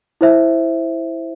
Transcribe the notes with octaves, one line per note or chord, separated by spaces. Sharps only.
E4 C5 E5